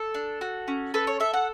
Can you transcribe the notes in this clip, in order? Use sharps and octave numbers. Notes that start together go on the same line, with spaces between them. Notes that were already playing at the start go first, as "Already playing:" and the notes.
Already playing: A4
D4
F#4
C#4
A4 B4
C#5
A4 E5
F#5